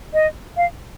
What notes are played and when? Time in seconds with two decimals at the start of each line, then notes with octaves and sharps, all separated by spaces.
0.14 D#5
0.57 F5